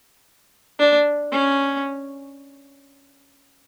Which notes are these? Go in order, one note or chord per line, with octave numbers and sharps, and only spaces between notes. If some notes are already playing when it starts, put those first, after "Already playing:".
D4
C#4